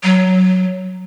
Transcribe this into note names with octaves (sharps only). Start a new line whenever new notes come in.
F#3